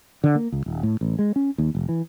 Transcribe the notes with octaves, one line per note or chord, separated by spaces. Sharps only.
D3
A#3
C#2
D#1
A2
A1
G#3
C#4
D#2
F1
E3